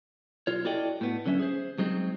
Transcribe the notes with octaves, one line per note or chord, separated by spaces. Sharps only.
B1 F4 C#5
E4 F#4 A4 D5 D#5 G5
A2 B3
D3 F#3 C#4 E5
G#4 C5
F#3 G#3 C4 D#4